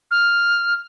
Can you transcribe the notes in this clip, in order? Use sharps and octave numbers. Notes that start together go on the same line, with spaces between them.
F6